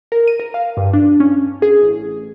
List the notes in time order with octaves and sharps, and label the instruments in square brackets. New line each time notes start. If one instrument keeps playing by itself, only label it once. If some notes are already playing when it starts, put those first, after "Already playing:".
[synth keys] A#4
D#7
A#4
F5
G2
D4
C#4
G#4
A1